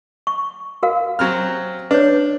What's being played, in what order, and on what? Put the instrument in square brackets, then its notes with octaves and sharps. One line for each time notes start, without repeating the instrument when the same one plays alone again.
[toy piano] C#6
F#4 A#4 F5
[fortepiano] F#3 C4 F6
[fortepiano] D4 [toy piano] B4 C#5